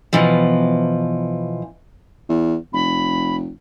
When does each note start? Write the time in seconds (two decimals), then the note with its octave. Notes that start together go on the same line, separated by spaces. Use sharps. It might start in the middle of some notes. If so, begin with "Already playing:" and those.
0.13 B2 E3 F3
2.29 E2
2.73 F1 B5